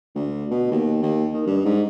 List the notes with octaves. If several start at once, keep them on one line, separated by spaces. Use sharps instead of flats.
D2
B2
D#2
D#2
D#3
G2
G#2